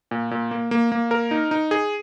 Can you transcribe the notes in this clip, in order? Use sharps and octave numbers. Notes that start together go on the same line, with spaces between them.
A#2
A#2
A#3
A#3
A#3
A#4
D#4
D#4
G#4